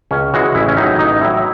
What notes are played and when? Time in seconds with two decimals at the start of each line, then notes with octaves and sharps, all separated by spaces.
0.11 C#2 C#4
0.34 C#3 E3 G#3 F#4
0.55 A1 E4
0.68 C#4
0.77 A2 F#3 D#4
0.98 A1 D#4
1.21 A2 F#3 E4